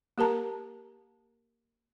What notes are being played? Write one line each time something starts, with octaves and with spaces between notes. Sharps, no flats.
A#3 G4 A#4 A5 A#5